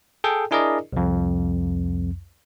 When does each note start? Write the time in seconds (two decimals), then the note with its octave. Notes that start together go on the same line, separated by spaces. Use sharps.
0.24 G#4 A4 G5
0.51 D4 E4 G#4 A#4 D5 D#5
0.93 C2 F2